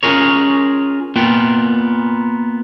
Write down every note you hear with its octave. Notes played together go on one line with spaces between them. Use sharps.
C#4 F4 G#4 A#4 C#5
A#3 B3 F4 G5